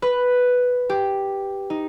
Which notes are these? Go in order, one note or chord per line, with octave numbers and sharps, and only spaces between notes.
B4
G4
D#4